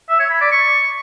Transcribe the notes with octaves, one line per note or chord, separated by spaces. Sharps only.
E5
C#5
B5
D5
C#6